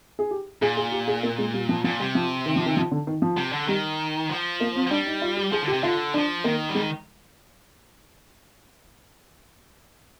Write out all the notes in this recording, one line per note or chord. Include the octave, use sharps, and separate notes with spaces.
G#4
G4
A#2 G#4
G#4
G4
G#4
A#3
G#3
G3
F3
A#2 F3
C3 G3
F3
D#3
F3
D#3
F3
D3
D#3
F3
C3
D3
D#3 G3
F3
A#3
C4
F3
G3 D4
D#4
F4
G4
F3 G#4
D3
G4
C3
D3 F4
F3 D4
D#3 A#3
G3
G#3